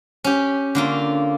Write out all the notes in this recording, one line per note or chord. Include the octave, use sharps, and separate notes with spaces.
C#4 G4
D3 A#3 F4